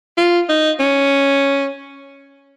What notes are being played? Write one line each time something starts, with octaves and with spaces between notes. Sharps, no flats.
F4
D#4
C#4